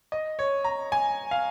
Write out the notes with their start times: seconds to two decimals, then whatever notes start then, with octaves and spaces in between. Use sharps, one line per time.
0.12 D#5
0.39 C#5
0.64 A#5
0.92 G#5
1.31 F5